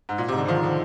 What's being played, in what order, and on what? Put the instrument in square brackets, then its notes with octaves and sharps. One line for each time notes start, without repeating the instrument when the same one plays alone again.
[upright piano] G#2
A#2
[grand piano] G#2 [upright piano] C3
[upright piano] D3
[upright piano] D#3 [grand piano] F3
[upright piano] D3